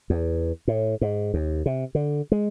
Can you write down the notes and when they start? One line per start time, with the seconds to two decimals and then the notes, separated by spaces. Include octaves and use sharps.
0.10 E2
0.68 A2
1.01 G#2
1.34 D#2
1.66 C3
1.95 D3
2.32 G#3